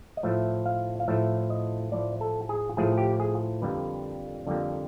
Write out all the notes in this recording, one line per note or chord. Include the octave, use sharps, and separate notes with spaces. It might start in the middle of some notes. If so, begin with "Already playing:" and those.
D#5
A2 F3 A3 E5
F5
F5
A2 F3 A3 E5
D#5
A2 F3 A3 D5
A4
G#4
A2 F3 A3 G#4
G4
G#4
F2 D3 G3 A#3 B4
F2 D3 G3 A#3